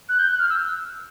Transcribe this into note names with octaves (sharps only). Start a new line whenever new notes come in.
F#6
G6
F#6
F6
E6